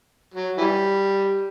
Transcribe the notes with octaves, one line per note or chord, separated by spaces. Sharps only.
F#3
E3 G3